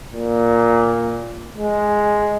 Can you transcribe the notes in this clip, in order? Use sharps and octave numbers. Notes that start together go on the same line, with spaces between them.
A#2
G#3